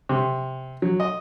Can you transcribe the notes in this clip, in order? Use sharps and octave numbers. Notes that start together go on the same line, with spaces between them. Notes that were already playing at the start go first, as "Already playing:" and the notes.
C3
F#3
D#5